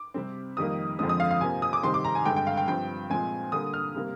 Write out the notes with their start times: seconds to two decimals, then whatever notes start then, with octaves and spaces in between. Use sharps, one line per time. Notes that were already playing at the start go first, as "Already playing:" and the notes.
Already playing: D6
0.14 C3 G3 C4
0.57 F2 D#3 G3 A#3 D#6
0.99 F2 D3 F3 G#3 C4 D#6
1.09 D#6
1.20 F5
1.31 F5
1.41 C3 F3 A#3 G#5
1.62 D#6
1.73 D6
1.83 C3 D#3 G3 C4 C6
1.94 D6
2.04 A#5
2.15 G#5
2.25 G2 D3 G#3 G5
2.36 G5
2.47 F5
2.57 G5
2.68 G2 F3 C4 G5
3.10 A#2 F3 G#3 C4 G#5
3.52 D3 G3 A#3 D#6
3.74 F6
3.95 C3 G3 A#3